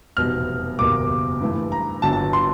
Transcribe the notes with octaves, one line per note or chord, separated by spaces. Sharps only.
F1 E2 B2 G3 F6
F#1 E2 B2 G3 A#3 D6
G2 E3 A3
A#5
G1 G2 D3 F#3 A5
A5
C6